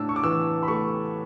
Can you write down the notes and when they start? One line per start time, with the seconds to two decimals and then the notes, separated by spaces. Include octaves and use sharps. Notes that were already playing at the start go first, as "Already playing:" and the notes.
Already playing: A2 A3 D4 A5 E6
0.09 C#6
0.16 D6
0.24 E3 E6
0.63 B5
0.68 A3 C#6